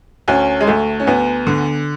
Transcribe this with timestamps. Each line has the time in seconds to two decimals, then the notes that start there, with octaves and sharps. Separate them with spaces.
0.28 D2 C#4
0.60 G#3
0.67 D2 A3
1.00 C#4
1.07 D2 B3
1.47 D3